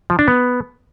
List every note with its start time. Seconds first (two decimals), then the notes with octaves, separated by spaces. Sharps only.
0.10 F3
0.19 D4
0.28 B3